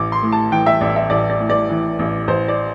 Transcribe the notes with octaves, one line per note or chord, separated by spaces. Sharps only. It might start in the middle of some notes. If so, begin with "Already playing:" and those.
Already playing: A1 D6
C6
A2
A5
E3 G5
E5
A1 D5
E5
A1 D5
D5
A2
D5
E3
A1
A1 C5
D5